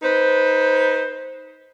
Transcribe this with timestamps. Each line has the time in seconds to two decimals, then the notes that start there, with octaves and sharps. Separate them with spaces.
0.03 D#4 B4 C5